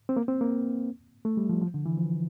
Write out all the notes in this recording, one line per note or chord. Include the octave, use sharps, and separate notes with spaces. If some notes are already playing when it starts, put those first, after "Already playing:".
C4
A#3
C4
A#3
A3
G3
F3
F3
D3
E3
F3